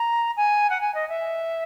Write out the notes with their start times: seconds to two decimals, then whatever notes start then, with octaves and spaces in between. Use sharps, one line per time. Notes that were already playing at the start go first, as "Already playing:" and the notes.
Already playing: A#5
0.36 G#5
0.69 F#5
0.80 G#5
0.94 D#5
1.08 E5